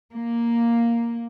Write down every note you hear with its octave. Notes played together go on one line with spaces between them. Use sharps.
A#3